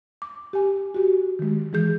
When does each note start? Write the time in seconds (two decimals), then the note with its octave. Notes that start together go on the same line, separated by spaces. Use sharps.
0.22 D6
0.53 G4 G#5
0.94 F#4 G4
1.39 D#3 G#3
1.73 E3 G#3 G#4 G6